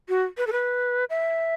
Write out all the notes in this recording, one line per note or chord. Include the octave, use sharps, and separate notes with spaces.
F#4
B4
A4
B4
E5